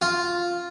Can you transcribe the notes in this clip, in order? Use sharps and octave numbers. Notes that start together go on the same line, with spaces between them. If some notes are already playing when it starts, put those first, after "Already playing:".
F4